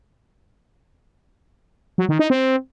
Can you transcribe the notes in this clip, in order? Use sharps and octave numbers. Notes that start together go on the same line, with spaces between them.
F#3
D#3
D#4
C4